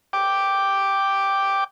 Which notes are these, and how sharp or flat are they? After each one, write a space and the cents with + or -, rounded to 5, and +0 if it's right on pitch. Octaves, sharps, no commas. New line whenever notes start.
G5 +0 D6 +0